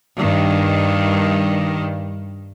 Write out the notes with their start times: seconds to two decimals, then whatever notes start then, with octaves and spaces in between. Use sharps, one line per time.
0.19 G2 D#3